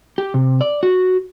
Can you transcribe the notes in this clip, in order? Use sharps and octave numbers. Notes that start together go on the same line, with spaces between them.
G4
C3
D5
F#4